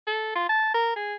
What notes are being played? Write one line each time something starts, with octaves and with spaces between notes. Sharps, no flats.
A4
F4
A5
A#4
G#4